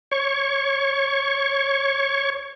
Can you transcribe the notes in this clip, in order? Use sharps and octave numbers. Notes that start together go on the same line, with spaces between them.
C#5 C#6